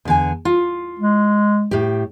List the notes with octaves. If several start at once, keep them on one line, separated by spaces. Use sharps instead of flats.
E2 D3 G#5
F4
G#3
A2 G4